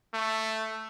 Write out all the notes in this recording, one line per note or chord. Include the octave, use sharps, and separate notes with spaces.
A3